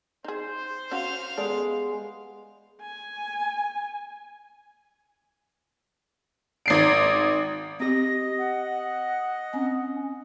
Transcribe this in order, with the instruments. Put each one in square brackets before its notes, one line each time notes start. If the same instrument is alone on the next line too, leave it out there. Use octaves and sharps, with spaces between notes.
[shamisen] D#4 G#4 [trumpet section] C5
[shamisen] C#4 F#4 [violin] F5 F7
[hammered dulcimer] G#3 B3 [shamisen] A4 D5
[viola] G#5
[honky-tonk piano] G#1 C7 D7
[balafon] C4 G4 [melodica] D#5 [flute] A#6
[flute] F#5
[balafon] C4 [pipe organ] C#4